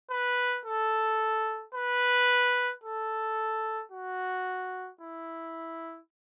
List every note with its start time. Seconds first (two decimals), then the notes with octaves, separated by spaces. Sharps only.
0.11 B4
0.65 A4
1.75 B4
2.84 A4
3.92 F#4
5.01 E4